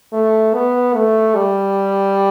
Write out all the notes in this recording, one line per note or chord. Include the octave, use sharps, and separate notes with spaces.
A3
B3
A3
G3